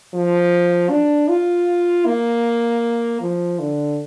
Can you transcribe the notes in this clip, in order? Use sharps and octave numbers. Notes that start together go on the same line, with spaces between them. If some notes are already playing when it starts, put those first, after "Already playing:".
F3
D4
F4
A#3
F3
D3